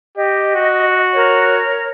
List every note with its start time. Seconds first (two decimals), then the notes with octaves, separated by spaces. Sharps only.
0.18 G4 D#5
0.55 F#4
1.14 A#4 C#5